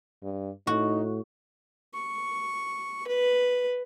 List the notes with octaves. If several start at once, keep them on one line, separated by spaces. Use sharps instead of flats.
G2
A2 D#4 F#4
C#6
B4